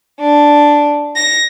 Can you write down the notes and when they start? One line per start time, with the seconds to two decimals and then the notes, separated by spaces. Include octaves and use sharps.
0.20 D4
1.16 A#6